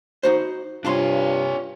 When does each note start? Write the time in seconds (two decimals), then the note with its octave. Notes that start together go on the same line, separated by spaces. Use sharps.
0.23 D#4 F#4 C5
0.85 C2 G2 D4 F4 C#5 F5 C6